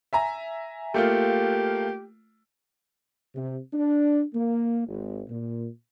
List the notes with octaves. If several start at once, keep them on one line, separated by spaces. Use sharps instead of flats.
E5 G#5 A#5
A3 A#3 F4 G4
C3
D4
A#3
G#1
A#2